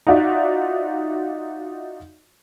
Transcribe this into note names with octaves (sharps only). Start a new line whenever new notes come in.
D#4 F4 F#4 D5 E5